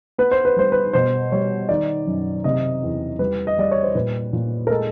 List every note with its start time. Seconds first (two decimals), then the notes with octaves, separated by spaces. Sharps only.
0.18 B3 B4
0.32 C5
0.45 B4
0.56 G3 C5
0.72 B4
0.93 B2 C5
1.32 G3 C#5
1.69 D#3 D5
2.06 F#2
2.44 C3 D#5
2.83 E2
3.19 G3 B4
3.47 D#5
3.58 G3 D5
3.71 C#5
3.83 C5
3.95 A#2 B4
4.33 A#2
4.67 A#4
4.70 G#3 A4